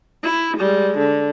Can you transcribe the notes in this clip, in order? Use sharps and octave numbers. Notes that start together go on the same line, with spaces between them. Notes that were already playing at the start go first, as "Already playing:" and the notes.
E4
G3 G#3
D3